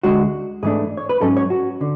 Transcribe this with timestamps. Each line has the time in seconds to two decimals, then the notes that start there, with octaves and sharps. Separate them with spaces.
0.03 D2 D3 G#3 F#4
0.63 G#2 E3 A3 D4 G#4
0.97 C#5
1.09 B4
1.21 G#2 F#3 C#4 A4
1.37 C#5
1.50 F#4
1.81 D3